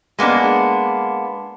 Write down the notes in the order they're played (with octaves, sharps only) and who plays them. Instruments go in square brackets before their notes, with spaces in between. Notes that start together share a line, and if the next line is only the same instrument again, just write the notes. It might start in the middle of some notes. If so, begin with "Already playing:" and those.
[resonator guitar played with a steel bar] G#3 A#3 B3 D4